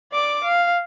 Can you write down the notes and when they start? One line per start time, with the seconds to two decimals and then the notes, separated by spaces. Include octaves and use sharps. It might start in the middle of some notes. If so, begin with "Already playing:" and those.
0.12 D5 D6
0.44 F5